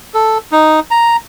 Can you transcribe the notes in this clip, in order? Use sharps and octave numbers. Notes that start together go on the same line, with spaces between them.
A4
D#4
A#5